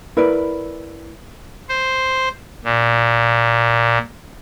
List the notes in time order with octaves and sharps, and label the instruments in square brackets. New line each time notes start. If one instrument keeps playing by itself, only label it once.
[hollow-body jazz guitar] E4 A#4 B4 D5
[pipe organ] C5
A#2